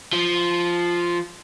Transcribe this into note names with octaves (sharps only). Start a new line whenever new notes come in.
F3